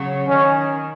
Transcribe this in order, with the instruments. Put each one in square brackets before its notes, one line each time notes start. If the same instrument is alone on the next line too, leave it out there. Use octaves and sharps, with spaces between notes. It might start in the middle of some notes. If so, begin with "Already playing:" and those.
Already playing: [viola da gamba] C#3 F#3
[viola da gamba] D#3 [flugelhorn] C#4